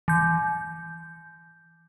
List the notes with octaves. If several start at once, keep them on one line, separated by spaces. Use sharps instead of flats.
E3 G6